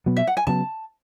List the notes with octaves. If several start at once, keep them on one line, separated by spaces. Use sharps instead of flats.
B2 F#3 B3
E5
F#5
G#5
C#3 F#3 B3 A5